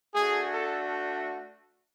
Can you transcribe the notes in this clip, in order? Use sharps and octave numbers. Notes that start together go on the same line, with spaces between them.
A3 D4 F#4 G#4
A4